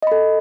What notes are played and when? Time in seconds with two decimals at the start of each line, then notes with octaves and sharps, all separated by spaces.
0.02 D#5
0.07 B5
0.12 A4